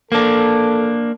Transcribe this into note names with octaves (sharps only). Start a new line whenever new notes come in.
A#3 D4 A4